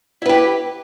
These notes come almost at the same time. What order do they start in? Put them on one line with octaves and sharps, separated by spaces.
E4 B4 G4